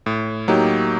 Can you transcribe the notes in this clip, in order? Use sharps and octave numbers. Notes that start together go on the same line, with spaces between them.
A2
F#3 A#3 D#4 G4